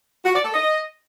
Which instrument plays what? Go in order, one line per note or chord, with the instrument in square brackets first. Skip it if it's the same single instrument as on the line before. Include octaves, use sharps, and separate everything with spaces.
[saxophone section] F#4
D5
A4
D#5